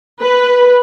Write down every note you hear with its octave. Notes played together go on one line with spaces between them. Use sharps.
B4